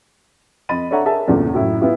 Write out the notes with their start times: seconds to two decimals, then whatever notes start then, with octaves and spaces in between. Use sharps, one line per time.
0.69 F2 D#5 B5 A6 D#7
0.91 D4 A4 C#5 E5 F#5 A#5
1.06 G#4 A#4 E5 A5
1.28 E2 G2 A#2 C#3 A3
1.53 F#2 A2 E4
1.81 B3 E4 F4 G4